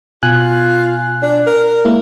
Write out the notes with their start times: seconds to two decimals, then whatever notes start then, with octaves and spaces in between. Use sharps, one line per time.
0.23 B2 F4 G#5 F#6
1.23 D4
1.47 A#4
1.85 G#3 A#3 E4